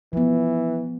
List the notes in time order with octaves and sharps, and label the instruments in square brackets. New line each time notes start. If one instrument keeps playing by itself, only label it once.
[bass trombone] E3 [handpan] F3 B3